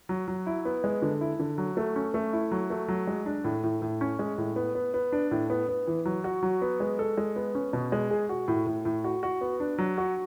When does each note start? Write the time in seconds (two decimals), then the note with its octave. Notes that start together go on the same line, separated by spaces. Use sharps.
0.09 F#3
0.28 F#3
0.46 E4
0.65 B3
0.84 G#3
1.02 D3
1.21 E4
1.39 D3
1.58 F#3
1.77 A3
1.96 C#4
2.14 A3
2.33 E4
2.51 F#3
2.70 A3
2.88 F#3
3.07 G#3
3.26 D4
3.44 A2
3.63 A2
3.82 A2
4.01 C#4
4.19 G#3
4.38 A2
4.56 B3
4.75 B3
4.94 B3
5.12 D4
5.31 A2
5.50 B3
5.69 B3
5.87 E3
6.05 F#3
6.24 F#4
6.43 F#3
6.62 B3
6.80 G#3
6.99 A4
7.17 G#3
7.36 B3
7.55 C#4
7.73 B2
7.92 G#3
8.11 G#4
8.29 F#4
8.48 A2
8.67 A2
8.85 A2
9.04 F#4
9.23 F#4
9.41 B3
9.60 D4
9.78 F#3
9.98 F#4